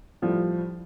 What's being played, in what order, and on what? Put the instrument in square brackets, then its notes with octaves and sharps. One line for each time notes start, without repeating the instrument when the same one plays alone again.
[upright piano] A2 F3 G3